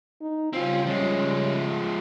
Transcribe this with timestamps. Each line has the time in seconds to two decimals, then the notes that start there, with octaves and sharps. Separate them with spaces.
0.21 D#4
0.53 C#3 G3 C4 C#4 F4
0.86 F3 G#3 C#4